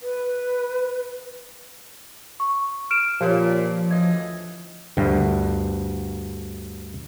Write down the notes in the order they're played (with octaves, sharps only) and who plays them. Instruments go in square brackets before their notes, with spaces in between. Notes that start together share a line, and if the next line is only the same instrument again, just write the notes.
[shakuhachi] B4
[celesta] C#6
F6 D7 E7
[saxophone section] A#2 [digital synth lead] F3 [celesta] G4 C#5
[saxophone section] D2 E3 D#5 [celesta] G#6
[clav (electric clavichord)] D2 G2